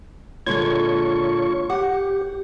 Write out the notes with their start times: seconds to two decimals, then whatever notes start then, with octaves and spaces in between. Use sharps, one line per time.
0.47 A#2 D3 G#3 F4 C#5 C#6
1.70 G4 F#5